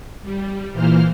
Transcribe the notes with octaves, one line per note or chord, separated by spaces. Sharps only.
G3
A#2 E3 A#3 C5 F6